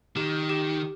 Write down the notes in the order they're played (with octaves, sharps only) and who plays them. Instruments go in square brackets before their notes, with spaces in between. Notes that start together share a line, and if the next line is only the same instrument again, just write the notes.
[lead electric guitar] D#3 [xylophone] G4
[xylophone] G4